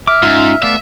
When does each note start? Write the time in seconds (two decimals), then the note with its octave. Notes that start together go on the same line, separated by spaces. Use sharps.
0.07 E5 D6 F6
0.23 G#2 C#4 D#4 F4
0.62 A3 B3 D5 E5 F5 E6 F6